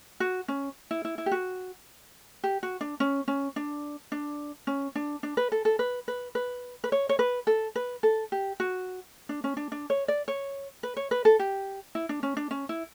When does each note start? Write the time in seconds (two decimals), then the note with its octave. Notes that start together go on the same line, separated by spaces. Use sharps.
0.20 F#4
0.48 C#4
0.91 E4
1.05 E4
1.18 E4
1.26 G4
1.31 F#4
2.44 G4
2.63 F#4
2.81 D4
3.00 C#4
3.28 C#4
3.56 D4
4.12 D4
4.67 C#4
4.95 D4
5.23 D4
5.37 B4
5.52 A4
5.65 A4
5.79 B4
6.08 B4
6.35 B4
6.84 B4
6.92 C#5
7.09 C#5
7.19 B4
7.47 A4
7.76 B4
8.03 A4
8.32 G4
8.60 F#4
9.29 D4
9.44 C#4
9.57 D4
9.72 D4
9.90 C#5
10.08 D5
10.28 C#5
10.83 B4
10.97 C#5
11.11 B4
11.25 A4
11.39 G4
11.95 E4
12.09 D4
12.23 C#4
12.37 D4
12.51 C#4
12.69 E4